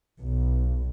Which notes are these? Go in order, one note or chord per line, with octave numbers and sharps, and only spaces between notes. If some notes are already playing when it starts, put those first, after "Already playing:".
B1